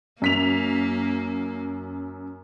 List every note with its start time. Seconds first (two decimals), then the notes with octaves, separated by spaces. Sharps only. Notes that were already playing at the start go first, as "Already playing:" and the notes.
0.22 F#2 A#3 B6 F7